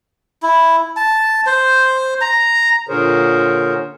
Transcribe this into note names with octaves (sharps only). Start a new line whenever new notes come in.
E4
A5
C5
A#5
A#2 D3 G#4 A#4 C5 C#5